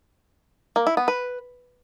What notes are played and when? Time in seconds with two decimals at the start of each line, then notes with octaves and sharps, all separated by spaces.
0.76 A#3
0.87 E4
0.97 B3
1.08 B4